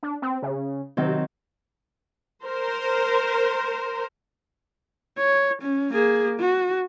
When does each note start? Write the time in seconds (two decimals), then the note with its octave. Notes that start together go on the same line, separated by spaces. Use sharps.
0.03 D4
0.22 C4
0.43 C#3
0.97 C3 D#3 F#3 C4
2.45 A#4 C5
5.18 C#5
5.62 C#4
5.93 A#3 G#4
6.40 F#4